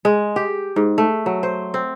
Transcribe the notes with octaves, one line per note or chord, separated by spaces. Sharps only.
G#3
G4
G#2
A3
F#3
C5
C4